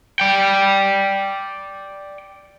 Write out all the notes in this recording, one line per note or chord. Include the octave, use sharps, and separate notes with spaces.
D5 G5